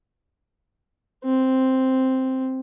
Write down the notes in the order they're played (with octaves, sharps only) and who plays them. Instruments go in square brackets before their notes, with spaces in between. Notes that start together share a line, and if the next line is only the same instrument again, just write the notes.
[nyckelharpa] C4